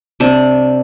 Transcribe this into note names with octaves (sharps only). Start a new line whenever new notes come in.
C3 D4